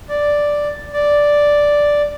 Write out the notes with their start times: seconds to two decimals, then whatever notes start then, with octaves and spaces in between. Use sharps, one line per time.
0.09 D5
0.93 D5